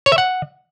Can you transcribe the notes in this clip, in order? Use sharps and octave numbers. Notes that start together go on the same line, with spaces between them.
C#5
E5
F#5